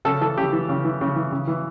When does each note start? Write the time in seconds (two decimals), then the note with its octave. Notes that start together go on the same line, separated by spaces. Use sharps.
0.05 C#3 A4
0.21 E3 A4
0.37 C#3 G4
0.53 E3
0.69 C#3
0.85 E3
1.01 C#3
1.16 E3
1.32 C#3
1.47 E3